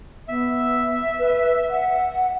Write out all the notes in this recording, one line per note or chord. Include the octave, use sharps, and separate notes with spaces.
B3 E5
B4
F#5